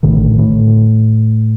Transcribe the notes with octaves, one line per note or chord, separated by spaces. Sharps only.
A#1 A2 D3 D#3
A2